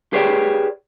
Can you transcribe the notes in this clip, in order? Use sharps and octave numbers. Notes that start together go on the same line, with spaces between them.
G4 G#4 B4 C#5 D5 G5